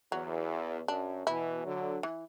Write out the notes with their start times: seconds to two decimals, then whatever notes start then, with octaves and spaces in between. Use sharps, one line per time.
0.12 E2 F#3
0.88 F#2 D4
1.26 B2 E3 E4
1.64 D3 F#3
2.03 E3